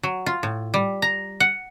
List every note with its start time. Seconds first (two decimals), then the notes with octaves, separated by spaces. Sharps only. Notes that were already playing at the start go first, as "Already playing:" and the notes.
0.03 F#3
0.26 F4
0.43 A2
0.74 G3
1.02 A#5
1.40 F#5